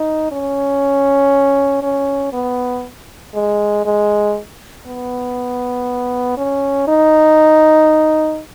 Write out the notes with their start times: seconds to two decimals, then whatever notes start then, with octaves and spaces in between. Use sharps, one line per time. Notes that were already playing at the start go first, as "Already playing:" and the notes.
Already playing: D#4
0.32 C#4
1.82 C#4
2.33 B3
3.34 G#3
3.85 G#3
4.86 B3
6.37 C#4
6.88 D#4